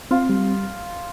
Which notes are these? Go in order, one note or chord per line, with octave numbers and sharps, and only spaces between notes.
C4 F4
G3